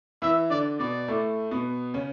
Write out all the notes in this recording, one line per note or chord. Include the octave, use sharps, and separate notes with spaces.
E3 E4 E5
D3 D4 D5
B2 B3 D5
A2 A3
B2 B3
C#3 C#4